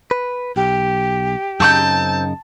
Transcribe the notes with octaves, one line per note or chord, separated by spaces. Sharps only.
B4
B1 G4
F#2 C#3 C4 D#4 A5 C#6 G6